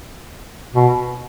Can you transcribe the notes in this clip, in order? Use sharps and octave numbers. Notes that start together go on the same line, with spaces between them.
B2